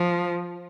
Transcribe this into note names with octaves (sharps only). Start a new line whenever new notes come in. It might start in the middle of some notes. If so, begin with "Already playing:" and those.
Already playing: F3